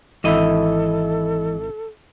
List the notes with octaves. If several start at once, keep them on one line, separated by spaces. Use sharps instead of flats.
G#1 E3 E4 A4 D#5 E5